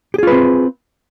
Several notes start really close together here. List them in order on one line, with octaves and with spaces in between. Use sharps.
G4 G#4 F4 B4 C4